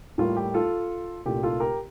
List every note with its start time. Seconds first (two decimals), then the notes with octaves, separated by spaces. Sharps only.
0.18 A2 G3 A#3 F4
0.36 G4
0.54 F4 A4
1.26 C2 A#2 A3 G4
1.43 F4 A4
1.60 G4 A#4